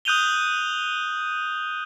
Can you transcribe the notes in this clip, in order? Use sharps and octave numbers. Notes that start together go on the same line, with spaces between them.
D#6 F#6 G6 D#7 F7 G7